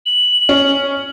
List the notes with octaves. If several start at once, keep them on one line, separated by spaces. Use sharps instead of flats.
F#7
C#4